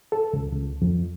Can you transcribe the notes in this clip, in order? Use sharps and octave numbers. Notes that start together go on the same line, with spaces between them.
A4
C#2
C#2
F2